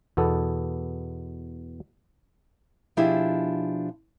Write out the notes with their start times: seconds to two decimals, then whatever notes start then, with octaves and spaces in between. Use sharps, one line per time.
0.17 E2 B2 B3 A4
2.97 B2 F3 D4 E4 G4 G#4